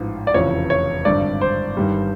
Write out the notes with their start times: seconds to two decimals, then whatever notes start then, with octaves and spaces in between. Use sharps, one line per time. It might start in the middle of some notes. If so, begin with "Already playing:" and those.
Already playing: A1 G#2 F3
0.27 D5
0.34 F1 E2 C#3 F3 C#5
0.70 C#5
1.05 G#1 G2 D3 D5
1.41 C5
1.77 G1 G2 D#3 G3